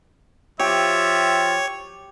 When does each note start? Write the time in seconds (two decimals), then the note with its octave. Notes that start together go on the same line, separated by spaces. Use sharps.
0.60 F3 G4 C#5 E5